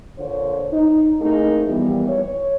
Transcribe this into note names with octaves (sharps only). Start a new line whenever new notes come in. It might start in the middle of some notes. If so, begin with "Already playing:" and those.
A#2 D3 F4 C5 C#5
D#4
A3 A#3 C4 D#4 E4 G#4
A#2 E3 F3 G3 B3
C#5